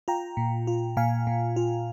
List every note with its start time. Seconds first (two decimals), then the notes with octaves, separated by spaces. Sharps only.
0.08 F4 G5 A#5
0.37 A#2
0.67 F4
0.97 A#2 F5 G#5
1.27 A#2
1.56 F4